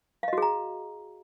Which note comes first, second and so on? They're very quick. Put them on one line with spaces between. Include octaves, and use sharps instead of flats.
F5 D#5 F#4 G#4 A#5